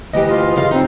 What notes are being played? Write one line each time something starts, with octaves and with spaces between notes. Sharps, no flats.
D2 E3 G4 D#5
F4 D#5
C#3 F5
C4 D#4